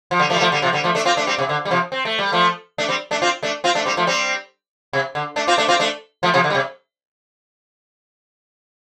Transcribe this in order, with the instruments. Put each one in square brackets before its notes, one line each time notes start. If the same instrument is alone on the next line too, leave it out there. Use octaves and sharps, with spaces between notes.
[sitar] F3
D3 G3
F3 A3
G3
F3 A3
D3 G3
C3 F3
D3 G3
F3 A3
A3 D4
C4 F4
A3 D4
G3 C4
C3
D3
G3
C3 F3
C4
A3
G3
F3 A3
A3 D4
G3 C4
A3 D4
C4 F4
A3 D4
C4 F4
A3 D4
G3 C4
F3 A3
G3 C4
C3
D3
A3 D4
C4 F4
A3 D4
C4 F4
A3 D4
F3 A3
C3 F3
D3
G3
C3